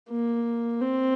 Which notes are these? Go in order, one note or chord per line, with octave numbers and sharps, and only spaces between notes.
A#3
C4